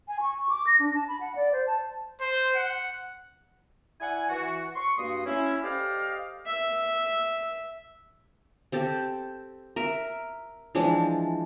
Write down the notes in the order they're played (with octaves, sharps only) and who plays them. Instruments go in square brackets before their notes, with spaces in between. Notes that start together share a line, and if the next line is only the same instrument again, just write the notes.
[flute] G#5
C#6
D6
A#6
D4
A5
B5
F#5
D5
C5
A5
[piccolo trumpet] C5
F#5
[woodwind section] E4 D5 F#5 G#5
E3 F#4
C6 C#6
G2 A#3 F#4 C6 D#6
C#4 E4
G4 A4 C5 D5 D#5 F5
[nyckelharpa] E5
[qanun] C4 G4 A4
A#4 E5
E3 F3 G#3 D4